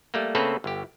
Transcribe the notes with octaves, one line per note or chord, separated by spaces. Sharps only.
G3 A3 A#3
C#3 A3 A#3 C4 A4 B4
G1 G4